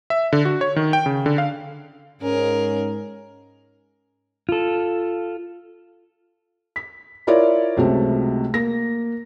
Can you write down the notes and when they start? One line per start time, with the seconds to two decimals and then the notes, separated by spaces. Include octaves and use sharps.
0.10 E5
0.33 D3
0.45 F#4
0.61 C#5
0.76 D#3
0.93 G5
1.06 C#3
1.26 D3
1.38 F5
2.21 G#2 C#4 G#4 A#4
4.49 F4 A4
6.76 B6
7.27 E4 F4 A#4 C#5 D5
7.77 C#2 C3 F#3 A3
8.54 A#3 A#6